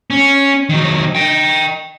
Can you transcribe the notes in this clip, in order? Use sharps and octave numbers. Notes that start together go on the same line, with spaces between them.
C#4
D#3 F#3
D#5 G5